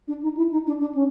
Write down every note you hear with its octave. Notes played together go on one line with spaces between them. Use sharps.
D4
D#4
E4
D#4
D4
D4
C#4